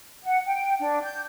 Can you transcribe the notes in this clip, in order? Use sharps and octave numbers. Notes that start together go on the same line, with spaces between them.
F#5
G5
D4
G6